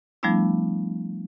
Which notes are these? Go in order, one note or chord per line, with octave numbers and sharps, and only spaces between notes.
F3 G3 A3 B3 D4 E4